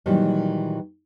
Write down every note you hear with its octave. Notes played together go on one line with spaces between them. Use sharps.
A#2 D#3 E3 F#3 G3